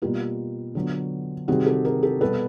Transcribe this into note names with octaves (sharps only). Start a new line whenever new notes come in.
B2 G3 A#3 F4 G4
D3 F#3 B3
C3 D#3 G3 C4 F#4 G#4
G4 A4
G#4 A#4
G4 A4
B2 G3 B3 A4 B4